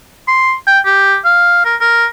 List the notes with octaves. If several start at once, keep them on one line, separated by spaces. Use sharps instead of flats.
C6
G5
G4
F5
A#4
A#4